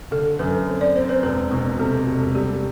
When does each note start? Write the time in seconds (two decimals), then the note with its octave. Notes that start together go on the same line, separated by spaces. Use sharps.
0.11 D3 A4
0.39 F#2 B4
0.67 C4
0.81 D5
0.95 C4 C5
1.09 B4
1.23 E1 B4
1.51 B2
1.79 C3 A4
2.07 E1
2.35 G3 G4